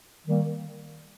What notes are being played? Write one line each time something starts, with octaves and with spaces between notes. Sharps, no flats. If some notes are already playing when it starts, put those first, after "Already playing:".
D#3 G3 A#3